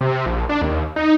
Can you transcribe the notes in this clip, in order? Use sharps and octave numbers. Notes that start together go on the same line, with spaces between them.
C3
A#1
D4
D#2
D#4